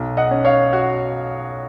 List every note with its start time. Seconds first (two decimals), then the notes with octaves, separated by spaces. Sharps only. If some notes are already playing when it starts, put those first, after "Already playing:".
Already playing: B1
0.17 D#5 F#5
0.31 C#4
0.45 C#5 F5
0.73 F#4